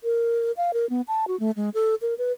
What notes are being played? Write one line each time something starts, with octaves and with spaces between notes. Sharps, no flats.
A#4
F5
A#4
B3
A5
F#4
A3
G#3
A4
A#4
B4